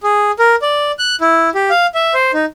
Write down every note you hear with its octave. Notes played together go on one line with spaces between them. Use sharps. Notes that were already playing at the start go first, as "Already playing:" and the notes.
G#4
A#4
D5
F#6
E4
G4
F5
E5
C5
D#4